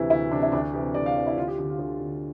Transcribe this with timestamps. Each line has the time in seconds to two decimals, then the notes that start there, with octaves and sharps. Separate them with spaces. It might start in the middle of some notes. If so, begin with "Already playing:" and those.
Already playing: D2 C3 E3 E4
0.10 D2 E4
0.31 C3 E3 D4
0.42 E4
0.52 D2 D4
0.73 C3 E3 G4
0.94 D2 D5
1.06 F5
1.16 C3 E3 D5
1.26 E4
1.37 D2 F4
1.47 G4
1.58 D3 G4
1.69 F4
1.79 D2 G4
2.00 D3